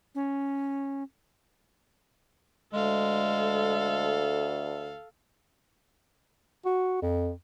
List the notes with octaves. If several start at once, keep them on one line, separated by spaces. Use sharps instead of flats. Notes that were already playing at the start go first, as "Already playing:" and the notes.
C#4
D2 G#3 A4 F5
F#4
F2